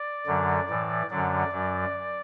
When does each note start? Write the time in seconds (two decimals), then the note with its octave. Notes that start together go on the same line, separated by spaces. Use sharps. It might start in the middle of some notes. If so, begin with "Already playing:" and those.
Already playing: D5
0.27 F#2 D3 F#3
0.69 A2 E3
1.10 F#2 D3 F#3 D5
1.52 F#2 F#3